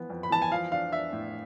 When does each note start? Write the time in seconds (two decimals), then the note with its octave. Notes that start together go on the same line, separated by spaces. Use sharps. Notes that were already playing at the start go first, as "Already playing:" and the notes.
Already playing: E3 F3 B3
0.10 F2
0.23 B5
0.30 E3 A5
0.42 G#5
0.51 F3 F5
0.72 D4 F5
0.92 D4 E5
1.13 A2